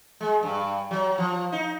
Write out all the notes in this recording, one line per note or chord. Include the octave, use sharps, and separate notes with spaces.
G#3
G2
F#3
F3
D#4